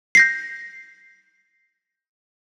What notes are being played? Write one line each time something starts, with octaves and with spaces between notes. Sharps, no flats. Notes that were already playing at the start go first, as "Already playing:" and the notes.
G6 A#6 C7